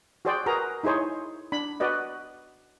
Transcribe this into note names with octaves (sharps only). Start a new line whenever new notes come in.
F#4 G#4 C5 D5 G5
F#4 G#4 A#4 B4 A#5
D#4 E4 G#4 C5 C#5
D4 B5
F#4 B4 D5 D#5